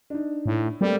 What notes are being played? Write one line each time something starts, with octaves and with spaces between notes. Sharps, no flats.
D4 D#4
A2
G3 A3 A#3 C4